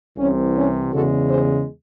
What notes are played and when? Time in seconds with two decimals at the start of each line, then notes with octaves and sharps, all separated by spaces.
0.17 C2 C3 E3 C#4
0.56 C#4
0.92 E2 C#3 G#3 F#4 A4
1.30 G#4 C5